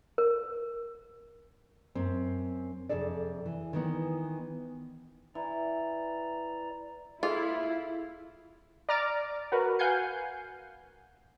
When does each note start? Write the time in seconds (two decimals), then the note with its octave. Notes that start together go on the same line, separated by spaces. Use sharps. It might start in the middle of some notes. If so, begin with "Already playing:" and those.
0.18 A#4
1.95 F#2 C4
2.89 F2 C3 G#4 A4 D5
3.46 E3
3.73 D#3 E3 B3
5.35 E3 D5 A#5
7.23 E4 F4 G#4 A4
8.89 D5 A#5 F6 A6 D7
9.52 F#4 A#4 B4
9.79 F5 F#5 G#5 G6 C7